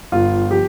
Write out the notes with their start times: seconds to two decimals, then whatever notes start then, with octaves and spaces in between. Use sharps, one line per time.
0.12 G1 F4
0.51 F3 G4